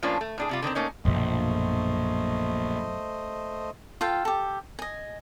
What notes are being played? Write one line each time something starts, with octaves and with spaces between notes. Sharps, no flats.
A2 F3 A#3 C#4 D4 F4
A3
A2 D4 G#4
C3 G3 F4
D3 D#3 B3 C4
A3 A#3 C#4 D#4
A#1 F#2 B2 A3 C5 D#5
F4 A4 F5 G5
G4 A4
D#5 G#5